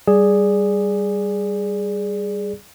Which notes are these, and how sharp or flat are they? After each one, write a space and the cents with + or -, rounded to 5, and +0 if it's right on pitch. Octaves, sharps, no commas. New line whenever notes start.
G3 +0 G#4 -5 D5 +0